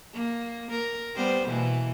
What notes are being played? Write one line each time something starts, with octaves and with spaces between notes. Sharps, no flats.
A#3
A#4
G3 B3 C5
B2 E3 A#3